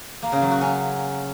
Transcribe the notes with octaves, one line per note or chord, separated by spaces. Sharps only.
A#3
C#3
F#3
F#4
C#4